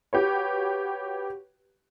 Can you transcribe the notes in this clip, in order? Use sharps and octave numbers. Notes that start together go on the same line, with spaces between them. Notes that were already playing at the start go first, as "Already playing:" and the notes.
F#4 G4 B4 C#5